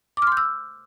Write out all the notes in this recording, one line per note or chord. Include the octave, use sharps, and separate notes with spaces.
C6 D6 E6 F6 G6